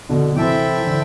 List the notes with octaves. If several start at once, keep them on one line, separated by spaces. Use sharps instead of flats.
B2 D3
F#3
C3 E3 C4 E4 A4 E5 G5
E3
D3